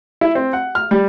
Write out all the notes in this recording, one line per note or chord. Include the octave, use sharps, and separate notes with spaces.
E4
C4
F#5
F6
G3